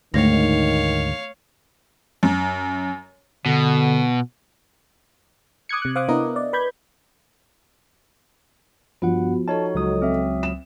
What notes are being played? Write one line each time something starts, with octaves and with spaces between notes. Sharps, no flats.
D2 G#2 D#3 A3 C#5 F5 A#6
F#2
B2 D3
D6 D#6 F#6 G#6 C#7
C3 F#6
C5 F5 D6 D#6 F#6
B3 D4 E4 A#4 D#5
D5
B4 B5 G6 G#6
G2 F3 B3 F#4 F#5
D#4 F#4 A4 C#5 D#5 A5
C#2 F#3 D#6
C4 E5
E7